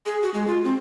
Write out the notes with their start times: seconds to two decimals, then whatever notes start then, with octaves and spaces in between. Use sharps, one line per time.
0.06 G#4
0.23 F#4
0.34 G#3
0.47 F4
0.64 C4